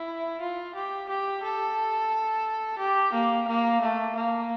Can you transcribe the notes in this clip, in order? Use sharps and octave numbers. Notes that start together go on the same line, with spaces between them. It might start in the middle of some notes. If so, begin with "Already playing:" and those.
Already playing: E4
F4
G4
G4
A4
G4
A#3
A#3
A3
A#3